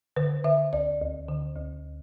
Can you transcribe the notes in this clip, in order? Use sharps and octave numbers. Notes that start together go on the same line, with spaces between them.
D3 B4
D3 E5
D2 D5
D2
D3
D2